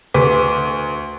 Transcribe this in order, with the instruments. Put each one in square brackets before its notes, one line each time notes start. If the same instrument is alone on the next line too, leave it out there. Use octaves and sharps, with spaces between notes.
[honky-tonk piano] D2 [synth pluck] B4 D6